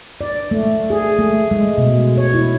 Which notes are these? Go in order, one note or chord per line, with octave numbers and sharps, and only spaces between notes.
D5
A3
G#4
A3
G#3
B2
C#5
E4